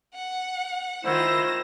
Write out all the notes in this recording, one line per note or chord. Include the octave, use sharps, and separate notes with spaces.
F#5
D#3 E4 F4 C5 A#6 E7